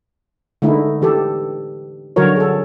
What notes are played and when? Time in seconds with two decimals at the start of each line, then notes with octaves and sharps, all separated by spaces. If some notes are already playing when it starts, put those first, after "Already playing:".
0.62 D3 G#3 A3 D#4 E4
1.02 E3 G4 A4
2.16 D3 F#3 F#4 A#4 C#5
2.36 G#4 A4